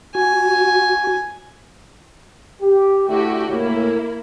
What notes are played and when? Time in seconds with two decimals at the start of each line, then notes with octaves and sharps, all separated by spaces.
0.15 F#4 G#5
2.62 G4
3.08 D2 D3 A3 E4 F#4 G4
3.49 A2 C#3 A#3 E4